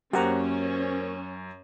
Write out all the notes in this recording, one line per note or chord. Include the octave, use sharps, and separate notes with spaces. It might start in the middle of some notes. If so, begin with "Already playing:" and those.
F#2 A#3 C#4 G4 A#4 C5 F#5 A#5